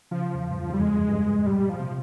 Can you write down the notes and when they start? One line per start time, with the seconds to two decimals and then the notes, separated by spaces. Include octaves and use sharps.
0.11 C#3 F3
0.34 E2
0.51 G2
0.56 F2
0.69 E2 G3
0.79 F2 G#3
0.96 F2
1.08 G2
1.13 F2
1.39 G#2
1.46 A#2 G3
1.69 F3
1.80 C3